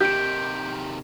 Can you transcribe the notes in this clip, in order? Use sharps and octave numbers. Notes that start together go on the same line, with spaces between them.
C3 D#3 G4 G6 D7